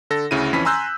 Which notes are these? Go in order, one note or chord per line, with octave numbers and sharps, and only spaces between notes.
D3 A4 A#6
D2 C#3 E4 D#7
F2 E3 C#4 B5 B6
G#5 A#5 C6 E6 F#6 G6